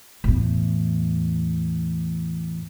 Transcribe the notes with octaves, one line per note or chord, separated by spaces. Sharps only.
E2 A2